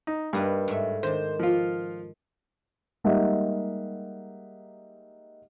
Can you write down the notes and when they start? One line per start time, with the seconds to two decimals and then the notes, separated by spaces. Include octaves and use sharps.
0.07 D#4
0.33 G2 A#3 D#4 B4
0.68 G#2 A3 E5
1.03 D#3 D4 C5
1.39 F3 F4
3.04 G3 G#3 A#3 D#4 E5 F#5